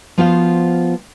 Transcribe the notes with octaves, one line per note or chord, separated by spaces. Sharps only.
F3 B3 F4 F#4 C5 F5